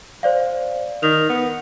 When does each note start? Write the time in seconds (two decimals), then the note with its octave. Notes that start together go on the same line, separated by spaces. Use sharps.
0.23 C5 D5 F5
1.03 D#3 F7
1.29 B3